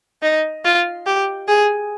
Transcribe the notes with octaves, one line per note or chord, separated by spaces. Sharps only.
D#4
F4
G4
G#4